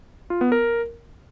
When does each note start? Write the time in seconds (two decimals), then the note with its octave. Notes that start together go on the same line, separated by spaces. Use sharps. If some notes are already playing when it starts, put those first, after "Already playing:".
0.30 F4
0.41 B3
0.52 A#4